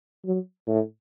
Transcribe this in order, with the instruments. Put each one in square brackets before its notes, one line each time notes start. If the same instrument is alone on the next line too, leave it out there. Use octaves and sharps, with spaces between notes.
[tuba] F#3
A2